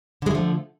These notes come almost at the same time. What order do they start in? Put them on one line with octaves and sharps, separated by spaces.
D3 G#3 A3 F3